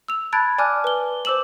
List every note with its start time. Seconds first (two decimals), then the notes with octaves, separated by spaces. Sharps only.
0.08 E6 F7
0.33 A5 B5 F#6 G#6 A6 D7
0.58 D5 G#5 A5 D6 F6 F#6
0.84 B4 G7
1.25 C5 D6 E6 E7 F#7